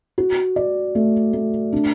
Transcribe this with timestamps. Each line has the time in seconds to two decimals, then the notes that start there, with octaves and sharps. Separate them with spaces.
0.18 F#4
0.56 D5
0.95 A3
1.33 A3
1.72 D4